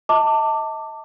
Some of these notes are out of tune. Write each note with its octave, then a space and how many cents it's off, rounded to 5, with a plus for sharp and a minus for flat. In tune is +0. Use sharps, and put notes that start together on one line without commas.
D#5 +40 A5 +25 D6 +0